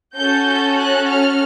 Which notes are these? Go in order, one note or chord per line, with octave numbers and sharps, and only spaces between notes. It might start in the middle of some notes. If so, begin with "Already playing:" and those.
C#4 F#4 A4 G6
G6
F#6
F6